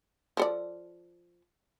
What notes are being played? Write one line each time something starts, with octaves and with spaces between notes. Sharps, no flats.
F3 A4 D5